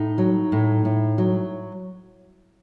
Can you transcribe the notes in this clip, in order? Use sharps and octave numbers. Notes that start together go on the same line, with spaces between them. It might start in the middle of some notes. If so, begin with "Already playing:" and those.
Already playing: A2 D#4
F#3
A2
A2
F#3